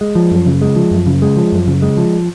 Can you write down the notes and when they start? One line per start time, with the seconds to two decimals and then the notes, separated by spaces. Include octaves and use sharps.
0.01 G#3
0.15 F3
0.31 F#2
0.46 C#3
0.62 G#3
0.76 F3
0.91 F#2
1.07 C#3
1.22 G#3
1.36 F3
1.52 F#2
1.68 C#3
1.82 G#3
1.97 F3